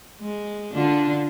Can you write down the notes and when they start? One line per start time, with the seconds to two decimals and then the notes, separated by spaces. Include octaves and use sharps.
0.20 G#3
0.73 D3 D4 F4